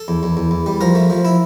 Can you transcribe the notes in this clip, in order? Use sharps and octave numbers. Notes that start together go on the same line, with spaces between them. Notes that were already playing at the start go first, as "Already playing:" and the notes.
Already playing: A4
E2
E2
E2
E2
G3
F3 A#4
A3
F3
E4